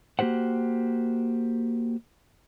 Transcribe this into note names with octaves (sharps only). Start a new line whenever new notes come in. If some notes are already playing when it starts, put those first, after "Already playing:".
A#3 F#4 G4 C5 F#5